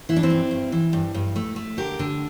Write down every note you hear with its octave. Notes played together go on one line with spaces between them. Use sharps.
E3 E4
D4
C4 E4
G2
G2
E3
G2
G2
A3
A3
D3 G4 A#4
D3